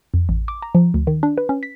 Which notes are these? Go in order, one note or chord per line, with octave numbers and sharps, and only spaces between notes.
F2
A1
D6
A#5
F3
D2
D#3
D4
B4
C#4
B6